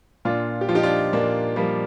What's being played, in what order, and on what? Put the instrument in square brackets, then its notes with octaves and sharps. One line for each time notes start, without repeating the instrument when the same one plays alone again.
[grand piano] A#2 D4 F4
G4
F3 F4
D#4 G4
D4 F4
A#2 A#3 D4
F3 G3 A#3